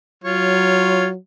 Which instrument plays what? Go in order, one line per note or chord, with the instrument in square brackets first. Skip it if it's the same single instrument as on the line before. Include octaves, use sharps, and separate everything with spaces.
[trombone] F#3 [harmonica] F4 C#5